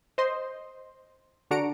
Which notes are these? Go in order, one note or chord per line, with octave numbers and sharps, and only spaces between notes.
C5 D#5 C6
D3 D4 F#4 A#5 C#7 D7